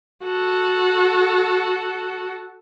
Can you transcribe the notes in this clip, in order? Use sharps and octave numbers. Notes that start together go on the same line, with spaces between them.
F#4 A4